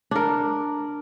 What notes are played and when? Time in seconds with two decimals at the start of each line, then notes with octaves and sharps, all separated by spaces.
0.11 D4 A#4